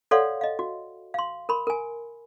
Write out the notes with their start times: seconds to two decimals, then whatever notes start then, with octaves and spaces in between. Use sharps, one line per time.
0.11 A4 C#5 D5 F5 F#5 C6
0.41 D#5 F5
0.59 F#4
1.14 F5 C6
1.49 A#4 B5 C6
1.67 A#4 G#5